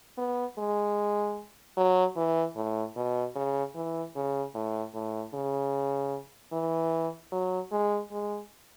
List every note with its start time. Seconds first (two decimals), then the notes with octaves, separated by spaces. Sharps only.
0.18 B3
0.58 G#3
1.77 F#3
2.16 E3
2.56 A2
2.96 B2
3.35 C#3
3.75 E3
4.15 C#3
4.54 A2
4.94 A2
5.34 C#3
6.53 E3
7.32 F#3
7.72 G#3
8.11 G#3